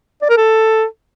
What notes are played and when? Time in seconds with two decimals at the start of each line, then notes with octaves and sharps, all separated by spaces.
0.22 D5
0.30 A#4
0.37 A4